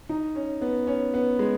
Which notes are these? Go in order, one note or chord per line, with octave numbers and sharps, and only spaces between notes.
D#4
C#4
B3
C#4
B3
G#3